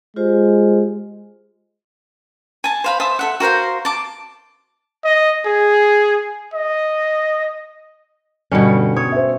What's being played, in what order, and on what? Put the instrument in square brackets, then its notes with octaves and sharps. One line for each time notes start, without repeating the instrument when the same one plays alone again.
[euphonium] G#3 [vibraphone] F4 G4 C5
[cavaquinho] G#5 A5
C5 F5 B5
C5 E5 A5 D#6
A4 E5 F#5
F#4 A#4 C5 F5
A5 D6
[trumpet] D#5
G#4
D#5
[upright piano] G1 A5 C#7 [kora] B2 G3 C#4
[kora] C#5 [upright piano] D#6
[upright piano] C5 E5